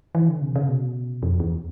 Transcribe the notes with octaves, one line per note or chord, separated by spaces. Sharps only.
E3
D3
C3
C#3
B2
F2
E2